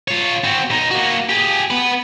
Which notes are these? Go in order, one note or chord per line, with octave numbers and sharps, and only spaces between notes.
F4 C#5
C4 F#4
B2 D#4
A#3 F#4
G4 G#4
B3 B4